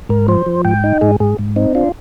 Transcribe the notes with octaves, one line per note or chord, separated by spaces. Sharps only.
G#2 A#4
F3 C5
F3
G#2 G5
D#4
G#2 G#4
G#2 G#4
G#2
C4 D#4
D4 F4